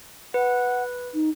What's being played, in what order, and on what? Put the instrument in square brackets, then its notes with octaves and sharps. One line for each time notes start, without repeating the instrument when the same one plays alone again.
[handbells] B4 [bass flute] F#5
[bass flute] D#4